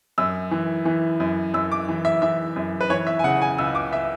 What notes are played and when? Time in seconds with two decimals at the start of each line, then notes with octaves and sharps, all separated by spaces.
0.18 F#2 E6
0.51 E3
0.85 E3
1.20 F#2
1.54 F#2 E6
1.72 D6
1.89 E3
2.05 E5
2.22 E3 E5
2.56 F#2
2.81 B4
2.90 E3 C#5
3.07 E5
3.19 G#5
3.24 C#3 F#5
3.42 G#5
3.58 C#2 E6
3.75 D6
3.93 E5